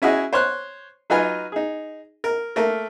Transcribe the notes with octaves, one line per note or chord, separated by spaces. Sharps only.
C#4 E4 F#4 G#4 D#5
C5 C#5 C6 F#6
F#3 D#4 F4 B4 G#5 F6
D#4 G#4
A#4
A3 A#3 A#4